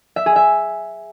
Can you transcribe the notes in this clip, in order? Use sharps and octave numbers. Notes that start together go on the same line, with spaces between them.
E5
G#4
E5